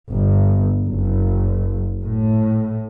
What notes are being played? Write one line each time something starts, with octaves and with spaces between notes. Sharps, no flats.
G1
F#1
A2